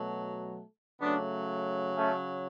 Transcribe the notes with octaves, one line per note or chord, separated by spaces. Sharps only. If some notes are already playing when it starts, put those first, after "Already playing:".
Already playing: B2 F#3 A3
C#3 F#3 A3 B3 D4
A3 C#4